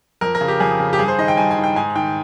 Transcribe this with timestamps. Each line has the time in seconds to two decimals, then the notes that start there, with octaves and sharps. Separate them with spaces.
0.21 F2 A#4
0.35 A#4
0.41 C#3
0.48 G4
0.60 F2 G#4
0.80 C#3
0.93 G4
0.99 G2 G#4
1.08 C5
1.18 D#3 D#5
1.28 G5
1.37 G2 G#5
1.51 G#5
1.57 D#3
1.64 G5
1.76 G#2 G#5
1.95 D#3 G5